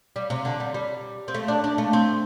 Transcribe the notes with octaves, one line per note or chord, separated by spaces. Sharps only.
G3
C3
D3
G3
G3
C4
A3
D4
D4
A3
C4